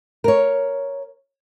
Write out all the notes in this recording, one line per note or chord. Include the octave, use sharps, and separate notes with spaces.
A#4 C#5